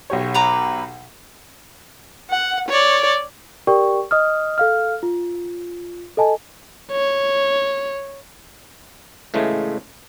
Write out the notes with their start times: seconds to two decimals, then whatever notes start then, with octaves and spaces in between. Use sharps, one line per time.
0.10 B1 G4 C#5
0.34 B4 A#5 D6
2.30 F#5
2.69 C#5 D5
3.67 G4 A#4 D5 G5 C#6
4.11 D#5 D#6 F6
4.58 A4 F5 F6
5.03 F4
6.17 A4 D#5 G#5 A5
6.92 C#5
9.34 A2 C#3 E3 G#3 A3